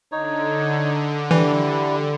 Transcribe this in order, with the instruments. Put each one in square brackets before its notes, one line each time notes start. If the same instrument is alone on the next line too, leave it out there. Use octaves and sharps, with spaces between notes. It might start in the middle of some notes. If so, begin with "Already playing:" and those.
[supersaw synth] D3 [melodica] D#4 C#5
[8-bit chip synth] E3 [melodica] G3 E4